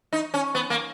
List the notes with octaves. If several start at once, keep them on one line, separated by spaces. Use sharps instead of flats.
D#4
C#4
B3
A#3